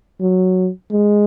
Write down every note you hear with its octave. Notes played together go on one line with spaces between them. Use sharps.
F#3
G#3